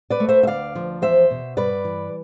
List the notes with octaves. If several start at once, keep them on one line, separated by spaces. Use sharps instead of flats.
B4 D5
A3
C5 E5
E5
D2 D5 F5
F3
E2 C5 E5
B2
G2 B4 D5
E3